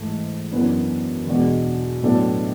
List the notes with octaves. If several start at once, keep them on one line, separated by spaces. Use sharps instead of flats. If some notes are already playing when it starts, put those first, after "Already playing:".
Already playing: G#2 E3 A3 E4
F#2 E3 B3 D4
E2 B2 G#3 D4 F#4
A2 F#3 B3 D4 A4